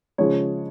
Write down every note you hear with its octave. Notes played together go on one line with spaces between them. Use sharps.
C#3 F3 G#3 C#5